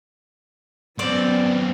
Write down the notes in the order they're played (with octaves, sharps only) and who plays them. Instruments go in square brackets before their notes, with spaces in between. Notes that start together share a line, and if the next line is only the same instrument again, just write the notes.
[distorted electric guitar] F#2 C4 [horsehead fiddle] B3 [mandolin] D5